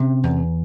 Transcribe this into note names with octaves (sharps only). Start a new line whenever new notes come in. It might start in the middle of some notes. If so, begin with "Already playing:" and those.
Already playing: C3 C#4
E2